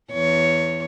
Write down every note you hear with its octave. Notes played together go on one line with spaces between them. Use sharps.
E2 C#5